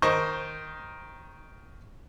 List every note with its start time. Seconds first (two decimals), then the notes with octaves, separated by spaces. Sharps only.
0.02 D#3 C5 D#5 C#6